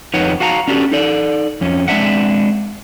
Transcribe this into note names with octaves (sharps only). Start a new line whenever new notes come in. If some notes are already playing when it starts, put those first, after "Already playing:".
F2 D#4 B4 C#5 F#5
F#4 F5 F#5 A5 A#5
C#4 D4 F#4 G4 A4
D#4 A4 D5
F2 C#4
G#3 C4 D4 E5 F#5